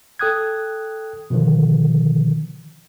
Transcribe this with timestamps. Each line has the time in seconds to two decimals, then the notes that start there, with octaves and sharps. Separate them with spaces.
0.19 A4 G5 D#6 F#6 G#6
1.30 B2 D3 D#3 F3